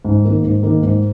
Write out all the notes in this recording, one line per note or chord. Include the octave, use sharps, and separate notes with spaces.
G#2
D#3 A#3
G#2
D#3 A#3
G#2